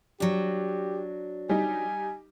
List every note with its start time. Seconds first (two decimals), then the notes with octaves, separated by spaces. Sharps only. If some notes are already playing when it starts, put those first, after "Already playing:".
0.20 F#3 D4 G4
1.49 G3 D#4 G#5